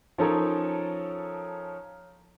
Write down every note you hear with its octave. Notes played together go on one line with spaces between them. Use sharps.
F3 C#4 D#4 A4 A#4 C#5